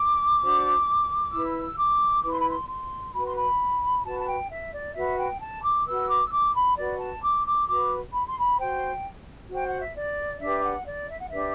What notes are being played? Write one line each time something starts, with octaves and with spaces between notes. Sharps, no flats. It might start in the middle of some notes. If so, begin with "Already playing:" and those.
Already playing: D6
D4 F#4 C5
E4 B4 E6
D6
E4 B4 D6
C6
B5
C6
C6
F#4 B4 B5
C6
B5
F#4 B4 A5
A5
G5
E5
D5
F#4 B4 E5
G5
A5
D6
F#4 B4 E6
D6
E6
D6
B5
F#4 B4 D5
A5
D6
D6
F#4 B4 D6
B5
C6
B5
F#4 C5 G5
F#4 C5 G5
F#5
E5
D5
D4 G4 B4 E5
F#5
D5
E5
F#5
D4 G4 B4 E5